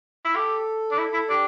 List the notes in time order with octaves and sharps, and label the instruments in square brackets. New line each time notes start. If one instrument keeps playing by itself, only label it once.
[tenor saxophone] E4
[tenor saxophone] G4 [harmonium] A4
[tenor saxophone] D4
E4
E4
[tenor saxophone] D4 [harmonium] G4